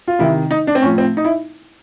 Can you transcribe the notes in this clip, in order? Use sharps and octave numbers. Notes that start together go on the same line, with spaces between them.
F4
C3 D#3 E4
D#4
D4
C4
A2 F3 C#4
C4
D#4
E4